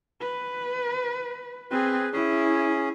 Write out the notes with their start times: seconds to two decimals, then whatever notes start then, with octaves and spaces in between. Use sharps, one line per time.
0.21 B4
1.71 C4 G#4 B4
2.13 C#4 E4 G#4